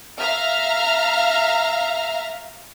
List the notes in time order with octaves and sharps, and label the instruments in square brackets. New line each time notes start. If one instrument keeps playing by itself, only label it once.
[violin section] E5 F5 A#5 F6